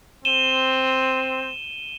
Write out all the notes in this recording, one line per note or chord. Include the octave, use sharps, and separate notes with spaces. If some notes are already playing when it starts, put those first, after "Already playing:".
C4 D#7 E7 G7